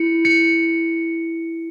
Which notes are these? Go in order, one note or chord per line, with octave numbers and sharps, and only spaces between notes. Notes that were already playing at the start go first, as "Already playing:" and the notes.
Already playing: E4 C#7
C#7